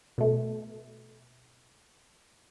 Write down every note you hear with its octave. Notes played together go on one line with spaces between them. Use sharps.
B2 A3